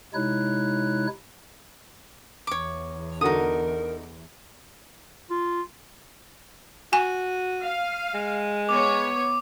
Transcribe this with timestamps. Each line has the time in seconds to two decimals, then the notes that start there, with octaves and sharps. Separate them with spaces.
0.14 C3 G#3 D#4 E4 C#5 F#6
2.47 E2 C#5 D6
3.21 D3 D#4 F#4 A#4 D#6
5.30 F4
6.93 F#4 G#5 D#7
7.63 F5
8.15 G#3
8.69 B3 C#5 D6